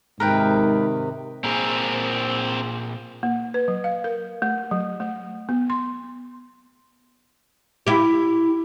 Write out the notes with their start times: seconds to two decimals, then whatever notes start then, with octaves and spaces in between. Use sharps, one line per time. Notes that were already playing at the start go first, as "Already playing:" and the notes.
0.20 G#2 C3 D#3 A#4 B4 G5
1.44 A#2 C4 G#4 A#4
3.23 A#3
3.54 B4
3.68 F#3
3.84 F5
4.04 A#4
4.42 A3
4.71 F#3
5.00 A3
5.49 B3
5.70 C6
7.87 E4 G4